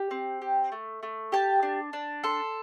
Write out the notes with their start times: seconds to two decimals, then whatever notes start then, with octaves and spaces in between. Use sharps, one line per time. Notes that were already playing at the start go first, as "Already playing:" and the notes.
Already playing: G4
0.11 C4
0.42 G4
0.72 A3
1.03 A3
1.32 G4 A5
1.63 D4
1.93 D4
2.24 A4 C6